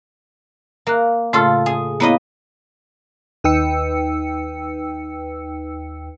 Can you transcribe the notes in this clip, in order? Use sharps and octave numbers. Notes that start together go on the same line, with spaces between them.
A#3 A#4 F#6
A2 C#3 A3 F4 A4
G#4
A#3 B3 E4 B4 C#5 D#5
D#2 D#4 B4 G5 E6 C#7